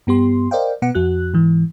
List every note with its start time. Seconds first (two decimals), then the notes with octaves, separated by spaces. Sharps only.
0.07 G2 B3 G4 C6
0.51 A#4 C5 D5 D#5 F5 G5
0.82 B2 B3 F#5 C#7
0.95 F2 F#4 F#6
1.33 G#2 E3